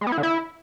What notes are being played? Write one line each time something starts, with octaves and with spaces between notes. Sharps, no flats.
G#3
B3
E4
D3
E4